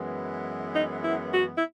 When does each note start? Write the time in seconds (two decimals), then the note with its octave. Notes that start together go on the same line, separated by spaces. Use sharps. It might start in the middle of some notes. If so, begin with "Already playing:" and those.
Already playing: F#2 E3 G#3 B3
0.72 D#4
1.02 E4
1.31 F#4
1.53 E4